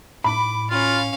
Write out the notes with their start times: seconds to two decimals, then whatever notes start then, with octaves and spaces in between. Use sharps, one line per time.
0.24 A2 B5 D6
0.70 C#4 F4 F5